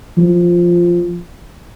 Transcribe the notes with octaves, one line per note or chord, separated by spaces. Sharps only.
F3